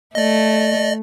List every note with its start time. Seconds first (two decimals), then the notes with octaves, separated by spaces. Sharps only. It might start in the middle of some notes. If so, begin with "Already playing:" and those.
0.15 A3 D5 D#5